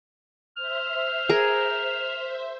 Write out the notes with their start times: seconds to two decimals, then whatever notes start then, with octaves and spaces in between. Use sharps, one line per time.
0.57 C5 E5 F6
1.29 G#4 A#4